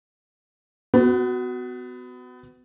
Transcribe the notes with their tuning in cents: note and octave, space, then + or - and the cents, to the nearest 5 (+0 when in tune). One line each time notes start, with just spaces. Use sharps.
B3 +30 F#4 +0